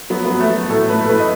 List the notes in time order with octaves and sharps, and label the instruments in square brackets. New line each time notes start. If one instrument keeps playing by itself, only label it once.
[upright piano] F#3 B3
B3
F#3
A3
F#3
A2 A4
A2 B4
A4
A2 B4
D#5